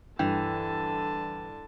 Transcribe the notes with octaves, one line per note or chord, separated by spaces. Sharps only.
G2 D3 E3 G5 A5